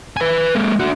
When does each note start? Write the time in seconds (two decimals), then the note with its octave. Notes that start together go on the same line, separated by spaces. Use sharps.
0.17 B4 G#5
0.55 G#3 A#3
0.80 D4 F#4